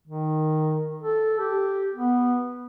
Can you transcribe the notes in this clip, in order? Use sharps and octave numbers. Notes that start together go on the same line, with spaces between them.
D#3
A4
G4
B3